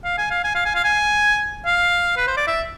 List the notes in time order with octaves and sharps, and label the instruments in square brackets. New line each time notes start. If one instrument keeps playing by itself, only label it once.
[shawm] F5
G#5
F5
G#5
F5
G#5
F5
G#5
F5
B4
C5
D5
E5